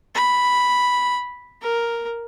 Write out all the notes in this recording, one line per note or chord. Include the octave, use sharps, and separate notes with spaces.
B5
A#4